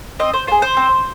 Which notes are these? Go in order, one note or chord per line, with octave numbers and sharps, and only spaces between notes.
C4 D#5
C5
F4 G#4 C5
C5
C4